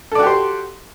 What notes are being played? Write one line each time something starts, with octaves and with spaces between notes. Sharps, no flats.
F#4 G4 A4 C5 D5